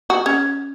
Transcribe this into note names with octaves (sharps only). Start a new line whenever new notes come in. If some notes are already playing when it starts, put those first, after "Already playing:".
F#4
C#4